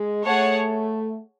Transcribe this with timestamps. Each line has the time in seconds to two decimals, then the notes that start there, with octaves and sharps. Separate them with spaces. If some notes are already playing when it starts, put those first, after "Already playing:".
Already playing: G#3
0.24 A3 G#4 C#5 F#5 A5